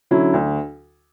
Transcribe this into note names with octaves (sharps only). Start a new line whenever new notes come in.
D3 F#3 C#4 E4
D2